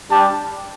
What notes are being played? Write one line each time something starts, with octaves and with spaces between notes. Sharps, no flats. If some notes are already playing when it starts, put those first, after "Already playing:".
G3 D4 G4 A5